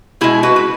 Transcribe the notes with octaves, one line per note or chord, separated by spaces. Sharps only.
B2 G#3 E4 G#4
F#4 B4
B4